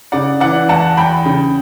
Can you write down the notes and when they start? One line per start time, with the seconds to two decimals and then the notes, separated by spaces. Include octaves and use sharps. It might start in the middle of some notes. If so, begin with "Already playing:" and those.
0.12 C#3 D5 F#5
0.40 E3 D5 F#5
0.69 E2 F#5 A5
0.97 E2 G5 B5
1.26 C#3